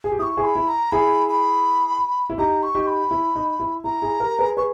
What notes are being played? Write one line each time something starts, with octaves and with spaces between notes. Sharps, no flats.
G#4
G4
E4 C#6 D#6
E4 G#4
B5
E4
A#5
E4 G#4 B5
B5
E4
D#4 G4 A#5
C#6
D#4 G4
B5
E4
D#4
E4
E4 A#5
E4 G#4
G4 A#4
G#4 B4
G#4 B4 C#6